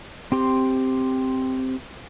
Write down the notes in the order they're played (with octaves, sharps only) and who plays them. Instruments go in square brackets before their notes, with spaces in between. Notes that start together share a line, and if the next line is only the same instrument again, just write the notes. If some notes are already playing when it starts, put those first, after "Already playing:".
[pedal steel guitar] C4 G4 C6